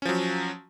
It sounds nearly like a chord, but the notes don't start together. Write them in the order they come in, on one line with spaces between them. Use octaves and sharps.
C#4 F3 F#3